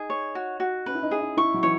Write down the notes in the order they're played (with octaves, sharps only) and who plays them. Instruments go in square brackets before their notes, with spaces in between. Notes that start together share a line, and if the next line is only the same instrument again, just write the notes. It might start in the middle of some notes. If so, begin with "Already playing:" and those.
Already playing: [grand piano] D#4 [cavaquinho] G#4
[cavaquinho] C#5
F#4
F#4
[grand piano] C#4 [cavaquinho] B4
[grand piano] E4
D#4
[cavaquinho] G#4
[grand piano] D#4
[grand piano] E4 [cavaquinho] C#6
[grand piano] F#3
[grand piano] E3 [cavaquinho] C#5